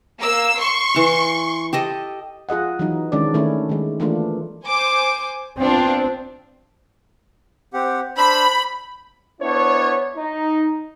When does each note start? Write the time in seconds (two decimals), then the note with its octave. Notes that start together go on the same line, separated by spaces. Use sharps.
0.21 A#3 E6
0.58 C6 C#6
0.94 E3 F5
1.73 G4 A4 D#5
2.49 F4 G#4 D#5 F#5
2.79 E3 F#3 D#4
3.12 D#3 G#3 C#4 D4 D5
3.34 D#3 A3 C#4 D4 E4 C#5
3.69 D#3 G#3
4.00 E3 A3 A#3 D4 F4
4.66 C5 G#5 D6
5.59 B3 C4 D4 F4
7.74 C4 G4 F#5
8.17 D4 C5 B5 E6
9.42 B3 D4 E4 C5 C#5
10.17 D#4